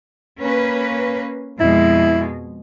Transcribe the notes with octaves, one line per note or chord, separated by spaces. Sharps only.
A#3 C#4 B4
F2 B2 G#3 E4